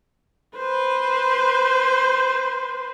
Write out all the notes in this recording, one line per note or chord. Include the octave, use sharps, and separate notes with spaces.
B4 C5